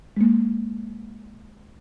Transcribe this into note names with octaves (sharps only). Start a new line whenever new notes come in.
G#3 A#3